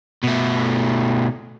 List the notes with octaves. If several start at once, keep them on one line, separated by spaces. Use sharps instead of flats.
B2 A3